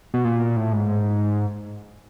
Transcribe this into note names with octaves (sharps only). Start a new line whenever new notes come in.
B2
A#2
A2
G#2